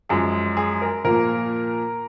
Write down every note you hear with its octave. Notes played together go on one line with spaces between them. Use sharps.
F#2 F3 G#3 G#4
G#4
A#4
A#2 F3 A#3 A#4